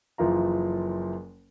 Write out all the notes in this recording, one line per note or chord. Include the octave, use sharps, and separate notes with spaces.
F#1 E3 F3 F4 A#5